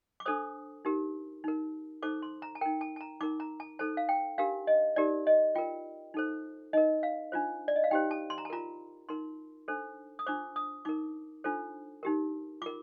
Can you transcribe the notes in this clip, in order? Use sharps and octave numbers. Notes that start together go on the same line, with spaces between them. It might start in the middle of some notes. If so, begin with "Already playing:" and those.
D6
D4 A4 C5 D#6
D#4 G4 A#4
D#4 A#4
D#4 A4 C5 D6
C6
A#5
A5
D#4 A#4 G5
A5
A5
A#5
D#4 A#4 D6
A#5
A5
D#4 A4 C5 A5
F5
G5
D4 G4 A#4 F5
D#5
D#4 G4 A#4 D5
D#5
F4 A#4 G5
D#4 A4 C5
D#4 A#4 D#5
F5
D4 F4 C5
D5
D#5
F5
D#4 G4 C5 G5
A5
C6
A#5
A5
F4 A#4 A#5
D#4 A#4 C6
D4 A4 C5
D#6
D4 F4 C5 D6
D#6
D#4 A#4 D6
D4 F4 A4 C5
D#4 G4 A#4
F4 A#4 D6